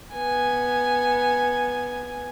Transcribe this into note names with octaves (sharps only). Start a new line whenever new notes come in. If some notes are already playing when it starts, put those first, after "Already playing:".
B3 G#5